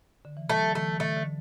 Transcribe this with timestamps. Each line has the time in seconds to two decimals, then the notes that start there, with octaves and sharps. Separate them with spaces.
0.25 D3
0.37 E3
0.49 F#3 A3
0.71 D3
0.75 E3 A3
1.00 D3 A3
1.16 D3